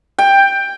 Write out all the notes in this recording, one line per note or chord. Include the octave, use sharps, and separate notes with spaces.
G5